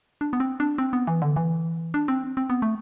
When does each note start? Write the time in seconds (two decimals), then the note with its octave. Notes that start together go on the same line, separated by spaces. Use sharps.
0.21 D4
0.33 B3
0.40 C4
0.60 D4
0.78 C4
0.93 B3
1.07 E3
1.22 D3
1.36 E3
1.94 D4
2.08 C4
2.37 C4
2.50 B3
2.62 A3